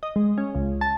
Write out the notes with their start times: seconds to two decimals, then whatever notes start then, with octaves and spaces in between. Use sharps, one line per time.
0.03 D#5
0.16 G#3
0.38 C#4
0.55 C#2
0.81 A5